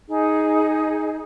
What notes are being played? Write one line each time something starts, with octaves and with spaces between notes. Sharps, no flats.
D#4 G#4